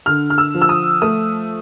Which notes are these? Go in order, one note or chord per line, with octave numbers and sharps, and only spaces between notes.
D3 F6
F6
E6
F3
E6
D#6
A3 D#6